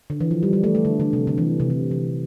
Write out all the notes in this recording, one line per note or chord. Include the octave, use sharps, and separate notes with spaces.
D3
E3
F3
G3
G3
A3
A3
D3
D3
C3
D3
E3
C3
D3
E3